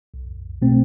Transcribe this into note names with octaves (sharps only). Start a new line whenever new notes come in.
B1
B2 A3 C4